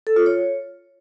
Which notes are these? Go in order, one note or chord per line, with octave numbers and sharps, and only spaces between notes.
A4
F4
C#5